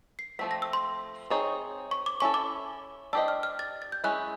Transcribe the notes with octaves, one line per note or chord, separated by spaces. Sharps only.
C7
F3 A3 C4 B6
A#6
E6
C6
C4 D#4 G#4 C#5
C#6
D6
C#4 E4 A4 C#6
D6
D4 G4 C5 D#5 E6
F6
F6
A6
A6
G6
G#3 C#4 E4 F#6